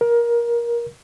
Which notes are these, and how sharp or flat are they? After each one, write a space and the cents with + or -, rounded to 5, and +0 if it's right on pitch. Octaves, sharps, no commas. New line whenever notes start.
A#4 +20